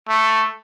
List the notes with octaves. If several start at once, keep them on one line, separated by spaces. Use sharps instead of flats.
A3